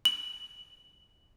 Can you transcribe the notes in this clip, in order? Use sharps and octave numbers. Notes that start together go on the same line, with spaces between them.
F#7